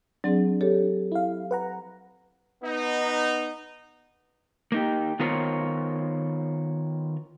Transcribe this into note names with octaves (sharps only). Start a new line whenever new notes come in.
F#3 C4 D4 G#4
G4 A4 C#5
E4 F5
B4 F#5 A#5
B3 D#4
A#3 D#4 G4
D#3 B3 F4 A#4 C5 C#5